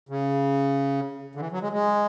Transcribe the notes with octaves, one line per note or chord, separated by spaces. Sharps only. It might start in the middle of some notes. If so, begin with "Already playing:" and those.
C#3
D3
E3
F#3
G#3
G#3